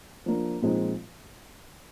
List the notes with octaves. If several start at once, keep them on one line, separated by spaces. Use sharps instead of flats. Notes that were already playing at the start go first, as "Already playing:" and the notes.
F3 A#3 D4
A#2 F3 G#3 C4 D#4